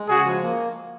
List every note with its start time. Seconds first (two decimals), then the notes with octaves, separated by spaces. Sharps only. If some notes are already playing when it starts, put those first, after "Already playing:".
Already playing: G#3
0.09 C#3 F#4 G#4
0.26 F3
0.42 A#3